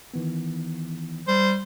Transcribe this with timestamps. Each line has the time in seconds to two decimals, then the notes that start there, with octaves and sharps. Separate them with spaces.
0.14 D#3 E3 B3
1.28 G3 C5